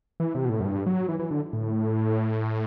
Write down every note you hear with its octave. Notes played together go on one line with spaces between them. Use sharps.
E3
C3
B2
A2
F#2
G2
F#3
E3
E3
D3
A2